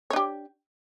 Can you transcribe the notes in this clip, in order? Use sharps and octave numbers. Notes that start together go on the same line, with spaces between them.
D4 G4 C#5